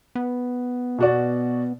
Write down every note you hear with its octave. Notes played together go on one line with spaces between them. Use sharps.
B3
B2 F#4 D5